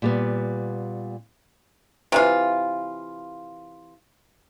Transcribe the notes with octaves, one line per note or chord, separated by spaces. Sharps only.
A#2 G3 B3
C3 E3 F4